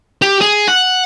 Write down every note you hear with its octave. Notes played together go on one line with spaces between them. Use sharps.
G4
G#4
F#5